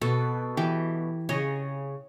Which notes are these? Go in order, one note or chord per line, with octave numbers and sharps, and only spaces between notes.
B2 A4
E3 G4
C#3 C#5 D#5